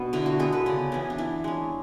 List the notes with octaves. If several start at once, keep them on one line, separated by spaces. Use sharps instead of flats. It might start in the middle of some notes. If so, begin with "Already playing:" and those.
Already playing: B2 B3 D4
D3 E4
F#4
G#3 B3 A4
B4
C#3 D5
E3 B3 E4
D4
E3 E4
G#3 C#4 D4